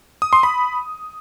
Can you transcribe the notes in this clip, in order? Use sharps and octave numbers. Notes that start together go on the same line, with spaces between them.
D#6
C6
B5